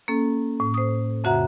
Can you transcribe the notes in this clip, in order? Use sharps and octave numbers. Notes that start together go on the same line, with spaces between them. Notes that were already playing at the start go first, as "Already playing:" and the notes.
A#3 C#4 A4
A2
C5 D#6
F2 C#3 F#4 E5 F#5 A#5